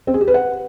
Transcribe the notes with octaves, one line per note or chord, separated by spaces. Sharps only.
C4
G#4
G4
B4
F#5